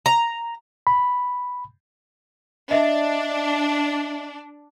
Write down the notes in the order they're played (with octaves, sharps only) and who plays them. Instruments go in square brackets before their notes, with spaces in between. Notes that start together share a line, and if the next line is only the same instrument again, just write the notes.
[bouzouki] A#5
[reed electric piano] B5
[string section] D4 [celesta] D#5 E5